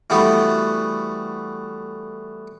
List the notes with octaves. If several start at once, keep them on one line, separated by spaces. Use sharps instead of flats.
E3 G3 A3 B3 F#4